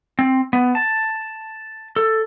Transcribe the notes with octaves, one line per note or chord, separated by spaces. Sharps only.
C4
B3
A5
A4